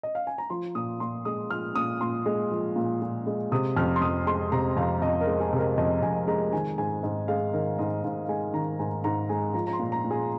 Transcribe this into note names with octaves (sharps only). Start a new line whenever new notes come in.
D#5
F5
G#5
A#5
F3 C6
A#2 D#6
A#2 C6
G#3 D#6
F3 F6
A#2 D#6
A#2 C6
G#3
F3
A#2
A#2
G#3
C3 D#6
F2 F6
C6
F2 D#6
G#3 C6
C3 A#5
F2 F5
F2 D#5
A#4
G#3
G#4
C3
A#4
F2 D#5
F2 G#5
G#3 A#5
D#3 G#5
G#2 G#5
G#2 D#5
G#3 F5
D#3 A#4
G#2 D#5
G#2 F5
F5
G#3 G#5
D#3 A#5
G#2 G#5
G#2 A#5
G#3 G#5
F3 A#5
A#5
C6
A#2
A#5
A#2
G#4